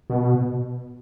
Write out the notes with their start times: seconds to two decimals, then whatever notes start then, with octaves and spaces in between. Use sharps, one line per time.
0.10 B2